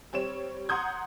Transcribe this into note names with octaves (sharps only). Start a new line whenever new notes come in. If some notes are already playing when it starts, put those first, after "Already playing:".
G3 C4 C#5 E7
F#5 A#5 C6 D#6 G6 G#6